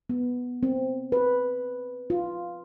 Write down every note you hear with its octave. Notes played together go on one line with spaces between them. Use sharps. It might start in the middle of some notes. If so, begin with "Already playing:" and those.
B3
C4
B4
F4